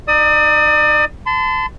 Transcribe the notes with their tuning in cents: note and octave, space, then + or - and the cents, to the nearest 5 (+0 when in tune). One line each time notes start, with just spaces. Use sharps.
D#4 -15 D5 +35 D#6 +25
A5 +0 C6 -40